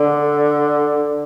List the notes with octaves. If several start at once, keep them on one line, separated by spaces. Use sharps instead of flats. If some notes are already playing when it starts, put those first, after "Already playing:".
Already playing: D3